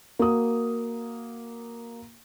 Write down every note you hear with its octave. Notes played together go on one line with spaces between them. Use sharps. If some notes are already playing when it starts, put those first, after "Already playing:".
A#3 F#4 D#6